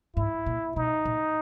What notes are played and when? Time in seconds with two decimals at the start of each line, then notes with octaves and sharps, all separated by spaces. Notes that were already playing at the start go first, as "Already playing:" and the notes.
0.16 G#2 E4
0.46 A#2
0.76 B2 D#4
1.05 A#2